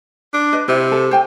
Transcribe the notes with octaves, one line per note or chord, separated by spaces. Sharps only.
D4
B4 D#5
C3 E4
A4
C5 G5 G#5